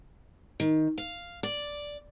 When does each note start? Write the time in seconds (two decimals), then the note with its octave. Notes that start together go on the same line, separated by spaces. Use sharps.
0.60 D#3
0.98 F5
1.43 D5